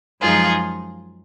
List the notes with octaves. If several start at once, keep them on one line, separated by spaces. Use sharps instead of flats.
F#2 F3 G#3 D#4 F4 G#4